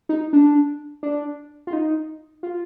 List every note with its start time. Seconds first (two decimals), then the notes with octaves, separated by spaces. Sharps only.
0.09 D#4
0.33 D4
1.03 D4
1.67 F4
1.73 D#4
2.43 F4